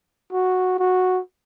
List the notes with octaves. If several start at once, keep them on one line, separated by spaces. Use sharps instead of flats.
F#4
F#4